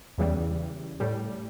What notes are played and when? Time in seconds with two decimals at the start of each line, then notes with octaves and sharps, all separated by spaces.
0.18 E2 C#3 E3 G3
1.00 A2 G3